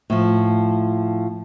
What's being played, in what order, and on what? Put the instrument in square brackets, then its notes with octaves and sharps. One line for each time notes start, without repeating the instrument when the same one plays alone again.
[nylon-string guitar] A2 F3